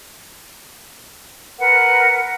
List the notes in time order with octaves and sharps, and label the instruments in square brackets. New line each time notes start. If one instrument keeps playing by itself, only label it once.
[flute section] A#4 B4 F#5